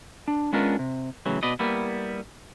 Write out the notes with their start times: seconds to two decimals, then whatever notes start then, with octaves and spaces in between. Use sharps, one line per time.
0.28 D4
0.53 G#3 B3 C#4 D4 F4 A#4
0.79 C3
1.26 A2 C#3 E3 F#3
1.43 B2 B4 D5 D#5
1.59 G3 A#3 B3 E4